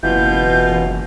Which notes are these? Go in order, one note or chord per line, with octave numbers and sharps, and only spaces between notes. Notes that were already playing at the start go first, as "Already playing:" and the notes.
F#1 B2 E3 F4 G6